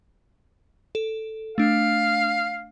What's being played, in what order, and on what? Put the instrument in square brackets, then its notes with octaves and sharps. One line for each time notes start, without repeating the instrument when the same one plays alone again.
[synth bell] A4
[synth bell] A3 D4 [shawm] F5